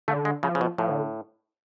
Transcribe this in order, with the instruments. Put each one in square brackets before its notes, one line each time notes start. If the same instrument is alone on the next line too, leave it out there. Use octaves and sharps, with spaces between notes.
[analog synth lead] D3 [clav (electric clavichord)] A3
[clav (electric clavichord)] G#3
[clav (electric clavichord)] C#3 [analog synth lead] F3
[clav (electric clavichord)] C#3
B2
[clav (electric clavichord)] A2 [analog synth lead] F3
[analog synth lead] D3